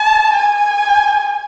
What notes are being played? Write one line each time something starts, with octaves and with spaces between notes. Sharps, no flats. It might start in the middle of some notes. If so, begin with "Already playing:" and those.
Already playing: A5
G#5